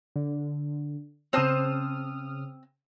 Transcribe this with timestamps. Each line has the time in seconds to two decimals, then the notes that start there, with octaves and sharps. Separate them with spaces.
0.16 D3
1.33 C#3 C4 C5 A5 D#6 F6